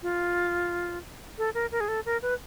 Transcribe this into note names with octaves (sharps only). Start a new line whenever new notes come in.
F4
A4
A#4
A#4
G#4
A4
A#4
B4